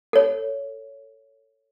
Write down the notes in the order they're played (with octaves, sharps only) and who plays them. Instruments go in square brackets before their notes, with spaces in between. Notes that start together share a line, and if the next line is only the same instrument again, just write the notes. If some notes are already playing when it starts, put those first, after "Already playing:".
[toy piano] A4 C#5